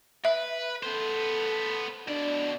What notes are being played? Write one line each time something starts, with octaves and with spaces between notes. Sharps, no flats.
B4 E5
B3 A4 C5
B2 D4 D5